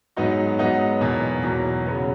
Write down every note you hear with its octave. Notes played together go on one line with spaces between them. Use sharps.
G#2 F#3 B3 D#4 F#4
G#2 F#3 B3 D#4 F#4
E2 B2 F#3 A#3
E2 B2 F#3 A#3
C#3 F#3 B3